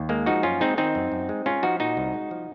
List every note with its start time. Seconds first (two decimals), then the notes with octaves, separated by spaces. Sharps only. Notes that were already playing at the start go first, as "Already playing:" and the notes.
Already playing: D#2
0.09 G#3 A#3
0.26 F3 D#4 F#4
0.43 F#2 C#4 F4
0.60 G#3 C4 D#4
0.77 D#3 C4 D#4
0.95 F#2
1.12 F#2
1.29 G#3
1.46 G#3 C#4 F4
1.63 F3 D#4 F#4
1.80 A#2 D#4 F#4
1.97 C2
2.14 G#3
2.31 F3